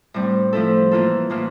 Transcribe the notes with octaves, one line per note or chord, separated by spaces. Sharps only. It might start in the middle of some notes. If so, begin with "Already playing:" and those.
A2 G3 C4
F3 A3 E4 A4
E3 A#3 F4 A4
A2 E3 A#3 F4